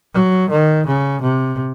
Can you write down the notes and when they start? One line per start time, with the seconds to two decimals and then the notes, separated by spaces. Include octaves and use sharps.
0.14 F#3
0.50 D#3
0.86 C#3
1.22 C3